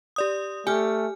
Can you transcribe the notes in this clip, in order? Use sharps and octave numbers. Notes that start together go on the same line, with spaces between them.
G4 D5 D#6
A3 G4 G#5 F6